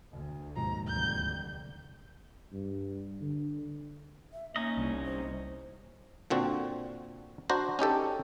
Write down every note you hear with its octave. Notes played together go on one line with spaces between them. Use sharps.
D2
D#2 G#2 B2 F3 A#5
F1 D2 D3 G3 G6
G2
D3
E5
A#3 C#4 D#4 D#5
C2
C5
A#2 D3 C4 F#4
D4 F#4 C5 A#5
C#4 D#4 G4 A4